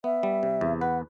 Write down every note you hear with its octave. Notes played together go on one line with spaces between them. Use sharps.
B3 E5
G3
C3
E2
B4 F#5